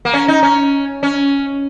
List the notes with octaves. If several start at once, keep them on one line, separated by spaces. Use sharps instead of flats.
A#3
C#4
D#4
C#4
C#4